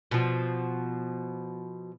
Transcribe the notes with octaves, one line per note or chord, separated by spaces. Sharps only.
B2 F3